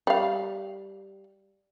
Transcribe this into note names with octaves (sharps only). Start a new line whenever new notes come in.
G3 F5